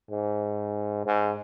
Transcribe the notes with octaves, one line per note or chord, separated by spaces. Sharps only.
G#2
G#2